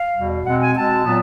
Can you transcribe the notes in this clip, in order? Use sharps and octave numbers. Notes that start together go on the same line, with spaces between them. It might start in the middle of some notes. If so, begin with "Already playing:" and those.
Already playing: F5
E2 B2 G3
B2 G#3 C4 F#5
G#5
B2 G#3 C4 A5
A#2 F#3 B3